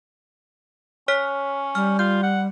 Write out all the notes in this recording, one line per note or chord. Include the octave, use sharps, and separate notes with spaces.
C#4 C#5 F6 B6
G3 F6
F4 G6
F#5